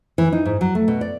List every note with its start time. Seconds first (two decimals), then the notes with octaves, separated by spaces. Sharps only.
0.18 E3
0.33 D#4
0.46 G#2
0.61 F#3
0.75 A3
0.88 B2
1.01 D5